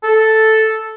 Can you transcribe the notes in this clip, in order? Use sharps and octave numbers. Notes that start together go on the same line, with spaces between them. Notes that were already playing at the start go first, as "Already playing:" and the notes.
A4